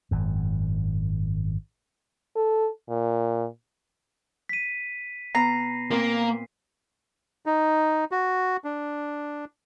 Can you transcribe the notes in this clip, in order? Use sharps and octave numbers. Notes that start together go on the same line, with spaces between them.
G#1 F#2
A4
A#2
B6 D#7
B2 B3 A#5 C7
A#2 A#3 C4
D#4
F#4
D4